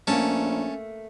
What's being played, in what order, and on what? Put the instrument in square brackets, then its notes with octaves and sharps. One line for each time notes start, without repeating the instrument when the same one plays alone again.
[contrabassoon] A#1 [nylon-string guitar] A3 A#3 [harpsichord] C#4 A5